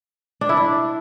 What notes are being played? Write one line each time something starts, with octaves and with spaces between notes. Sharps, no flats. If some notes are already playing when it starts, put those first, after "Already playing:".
D4
E4
D4